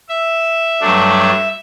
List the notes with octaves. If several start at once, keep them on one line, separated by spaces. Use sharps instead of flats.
E5
G2 F#3 A3 D4